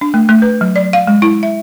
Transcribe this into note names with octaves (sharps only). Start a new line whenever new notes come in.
D4
A3
A3
B4
F#3
D5
F5
G#3
E4
E5